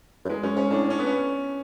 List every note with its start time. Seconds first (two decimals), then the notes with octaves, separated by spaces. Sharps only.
0.25 F#2
0.29 E2 G#3
0.43 F#2 C#4
0.56 G#2 C#4
0.71 A2 D4
0.90 C#4
0.99 B3
1.06 C#4